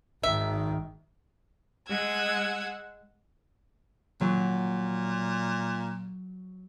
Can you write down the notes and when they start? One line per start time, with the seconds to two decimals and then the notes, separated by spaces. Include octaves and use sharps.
0.23 G#1 D#3 E5
1.88 G#3 F#5 E6 G#6
4.21 A#2 F#3